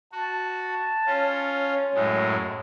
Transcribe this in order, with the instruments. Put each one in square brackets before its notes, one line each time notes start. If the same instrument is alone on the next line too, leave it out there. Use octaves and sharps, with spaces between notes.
[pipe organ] F#4 [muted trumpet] A5
[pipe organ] C#4 F4 [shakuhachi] C#5
[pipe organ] F#2 A2 G#3